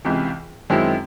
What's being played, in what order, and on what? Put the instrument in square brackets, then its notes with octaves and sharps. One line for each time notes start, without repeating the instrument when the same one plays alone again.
[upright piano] C#2 C3 E3
F#2 D#3 G#3 C4 E4